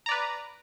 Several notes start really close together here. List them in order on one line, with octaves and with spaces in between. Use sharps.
A#5 D5 B4